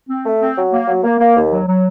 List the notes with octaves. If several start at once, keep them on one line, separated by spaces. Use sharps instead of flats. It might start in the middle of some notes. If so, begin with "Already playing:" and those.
C4
A3
C4
F#3
A#3
F#3
A#3
A#3
D#2
F#3
F#3